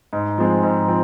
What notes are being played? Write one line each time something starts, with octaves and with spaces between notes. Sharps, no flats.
G#2
F3 G#3 C4
G#2
F3 C4